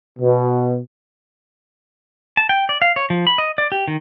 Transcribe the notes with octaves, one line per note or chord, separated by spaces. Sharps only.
B2
A5
G5
D5
F5
C#5
F3
B5
D#5
D5
G4
D#3